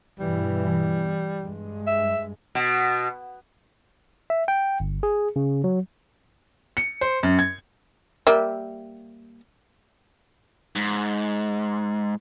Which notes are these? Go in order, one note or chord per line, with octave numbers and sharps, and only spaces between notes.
G2 B2 E3 G3
G2 G#3
E5
B2
E5
G5
G1
G#4
C#3
F#3
C#7
C5
F#2
G#6
G3 A#3 E5
G#2